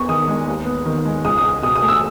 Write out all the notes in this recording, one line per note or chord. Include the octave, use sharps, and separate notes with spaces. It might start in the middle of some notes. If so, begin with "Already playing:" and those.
Already playing: E2 B3 C#6
D#3 D#6
G#3
D#2
B3
D#3
G#3
C#2 D#6
D#6
C#2
B2 D#6
D#6
A3
E6